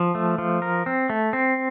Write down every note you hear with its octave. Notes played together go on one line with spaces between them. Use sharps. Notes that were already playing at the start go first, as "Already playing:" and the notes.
Already playing: F3
A3
F3
A#4
C4
A3
C4